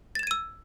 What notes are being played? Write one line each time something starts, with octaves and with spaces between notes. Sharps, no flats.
E6 G#6 A6 D#7 E7